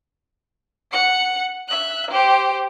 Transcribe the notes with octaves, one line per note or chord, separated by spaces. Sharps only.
F#5 C#7
E5 F#6
G4 C5